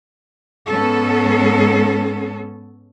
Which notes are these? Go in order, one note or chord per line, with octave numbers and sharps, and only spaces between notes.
G#2 B3 C#4 A4